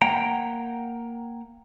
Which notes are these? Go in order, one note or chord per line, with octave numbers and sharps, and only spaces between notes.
A#3 F#5 G5 A#5